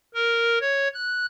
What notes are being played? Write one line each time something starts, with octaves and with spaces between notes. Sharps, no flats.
A#4
C#5
F#6